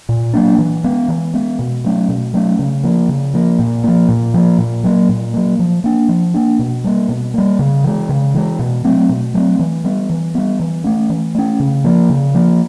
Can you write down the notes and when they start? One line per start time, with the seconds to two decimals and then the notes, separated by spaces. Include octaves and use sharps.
0.09 A#2
0.33 F#3 A#3 D4
0.59 E3
0.84 G#3 B3
1.08 E3
1.34 G#3 B3
1.59 B2
1.84 F#3 A3 C#4
2.08 B2
2.33 F#3 A3 C#4
2.59 C#3
2.84 F3 A#3
3.09 C#3
3.34 F3 A#3
3.59 A#2
3.84 F3 A#3
4.09 A#2
4.34 F3 A#3
4.58 A#2
4.84 F#3 A#3
5.09 A#2
5.34 F#3 A#3
5.59 F3
5.84 A#3 D4
6.09 F3
6.34 A#3 D4
6.59 B2
6.84 G3 A#3
7.09 B2
7.34 G3 A#3
7.59 C#3
7.84 E3 G#3
8.09 C#3
8.34 E3 G#3
8.59 B2
8.84 F#3 A3 C4
9.09 B2
9.34 F#3 A3 C4
9.59 E3
9.84 G3 B3
10.10 E3
10.35 G3 B3
10.60 E3
10.84 A3 C#4
11.09 E3
11.35 A3 C#4
11.60 C#3
11.84 F3 A#3
12.09 C#3
12.35 F3 A#3